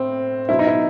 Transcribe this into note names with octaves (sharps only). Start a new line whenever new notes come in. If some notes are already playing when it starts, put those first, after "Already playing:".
Already playing: A2 C4
B2 F#3 E4
D#4
E4